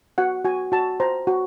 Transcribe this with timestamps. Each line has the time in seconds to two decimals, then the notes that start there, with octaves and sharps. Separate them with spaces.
0.18 F#4 F#5
0.45 F#4 G#5
0.72 F#4 A5
1.00 C5 A#5
1.27 F#4